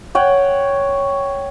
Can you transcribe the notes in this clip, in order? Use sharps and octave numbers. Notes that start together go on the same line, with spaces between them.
C#5 F#5 G5